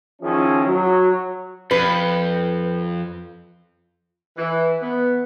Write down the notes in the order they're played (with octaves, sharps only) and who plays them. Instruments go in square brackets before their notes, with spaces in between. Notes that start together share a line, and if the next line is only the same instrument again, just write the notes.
[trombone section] D#3 F3 C#4 E4 G#4
F#3
[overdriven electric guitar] F2 [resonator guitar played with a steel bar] B4
[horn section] E3
B3